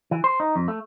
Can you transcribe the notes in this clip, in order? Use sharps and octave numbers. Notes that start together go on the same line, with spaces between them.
E3
C5
D#4
F2
A3